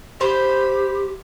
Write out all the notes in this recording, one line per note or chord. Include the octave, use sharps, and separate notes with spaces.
G4 C5 B5